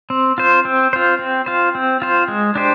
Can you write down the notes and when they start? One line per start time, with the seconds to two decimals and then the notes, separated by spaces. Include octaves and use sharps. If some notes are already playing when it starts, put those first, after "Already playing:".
0.10 C4
0.38 F4 C5
0.65 C4
0.93 F4 C5
1.19 C4
1.46 F4 C5
1.75 C4
2.02 F4 C5
2.28 G#3
2.55 D4 G4 C5